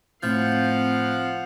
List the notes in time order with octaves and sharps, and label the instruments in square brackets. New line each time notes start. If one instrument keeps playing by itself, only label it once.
[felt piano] A2 [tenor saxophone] F3 [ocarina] C4 [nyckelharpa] F5 F#5